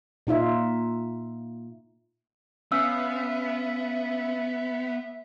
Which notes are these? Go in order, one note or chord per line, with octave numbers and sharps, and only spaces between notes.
A#2 D#4 F4 E5
B3 C#4 E5 F5 E6